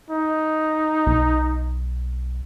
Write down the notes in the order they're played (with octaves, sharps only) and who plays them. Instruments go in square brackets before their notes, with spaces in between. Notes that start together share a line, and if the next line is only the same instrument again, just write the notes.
[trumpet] D#4
[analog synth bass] B1